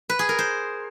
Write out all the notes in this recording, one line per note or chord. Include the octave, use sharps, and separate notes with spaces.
B4
G#4
A#4
C5